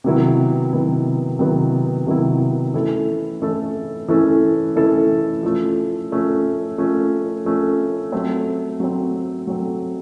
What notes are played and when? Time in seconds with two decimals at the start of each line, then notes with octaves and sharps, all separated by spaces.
0.04 C3 D#3 F#3 B3 E4
0.72 C3 D#3 F#3 B3 E4
1.39 C3 D#3 F#3 B3 E4
2.06 C3 D#3 F#3 B3 E4
2.74 E3 A3 C#4 E4 A4
3.42 E3 A3 C#4 E4 A4
4.08 E3 A3 C#4 E4 A4
4.76 E3 A3 C#4 E4 A4
5.43 F3 A3 C#4
6.11 F3 A3 C#4
6.78 F3 A3 C#4
7.45 F3 A3 C#4
8.12 F#3 A3 C4
8.80 F#3 A3 C4
9.47 F#3 A3 C4